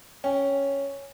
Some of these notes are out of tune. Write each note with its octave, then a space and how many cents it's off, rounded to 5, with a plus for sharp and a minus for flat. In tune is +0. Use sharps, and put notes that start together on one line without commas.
C#4 +0 G5 +0